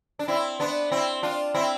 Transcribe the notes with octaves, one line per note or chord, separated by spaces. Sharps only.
D4
C4 E4
B3 D4
C4 E4
D4 F4
C4 E4